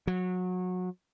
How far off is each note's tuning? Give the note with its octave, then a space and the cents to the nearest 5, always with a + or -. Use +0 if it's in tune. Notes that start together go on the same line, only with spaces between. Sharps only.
F#3 -25